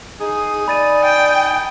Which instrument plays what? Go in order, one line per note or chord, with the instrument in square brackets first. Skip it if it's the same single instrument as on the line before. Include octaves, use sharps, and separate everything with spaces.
[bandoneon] D#4 G#5 D#6 [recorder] G#4
[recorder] D5 [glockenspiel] B5 A6 D#7
[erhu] G5